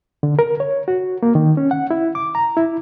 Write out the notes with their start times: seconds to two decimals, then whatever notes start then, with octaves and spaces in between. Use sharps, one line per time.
0.23 D3
0.39 A#4
0.60 C#5
0.88 F#4
1.23 A#3
1.35 D#3
1.57 C#4
1.71 F#5
1.91 E4
2.15 D6
2.35 A#5
2.57 E4